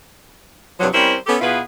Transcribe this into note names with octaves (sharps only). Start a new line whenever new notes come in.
G2 C3 F3 F#3
G3 C4 C#4 E4 A#4 C5
B3 C#4 G4 A4
B2 B3 E4 F4 G#4 B4